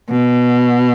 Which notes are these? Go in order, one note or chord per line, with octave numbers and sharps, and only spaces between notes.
B2